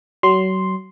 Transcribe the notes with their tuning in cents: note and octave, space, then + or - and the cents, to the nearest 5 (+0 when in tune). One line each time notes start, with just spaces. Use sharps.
F#3 +30 C6 +0